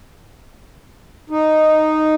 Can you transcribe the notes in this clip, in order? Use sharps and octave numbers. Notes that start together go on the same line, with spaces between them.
D#4